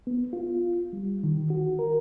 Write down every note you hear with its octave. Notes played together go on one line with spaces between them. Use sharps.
B3
F4
G3
D#3
F#4
A#4